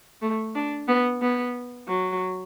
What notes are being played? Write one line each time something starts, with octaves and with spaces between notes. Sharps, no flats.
A3
D4
B3
B3
F#3